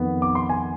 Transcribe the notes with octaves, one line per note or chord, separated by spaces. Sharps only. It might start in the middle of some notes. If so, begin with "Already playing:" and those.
Already playing: F2 D#3 B3
D6
C6
G#5